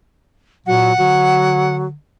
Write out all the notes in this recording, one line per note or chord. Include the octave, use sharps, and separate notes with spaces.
A#2 F#3 F#5
D3 F#3